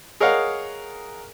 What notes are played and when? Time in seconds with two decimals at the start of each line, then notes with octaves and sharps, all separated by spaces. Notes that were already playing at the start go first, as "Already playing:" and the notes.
0.20 G#4 A#4 C#5 D#5 F5 F#5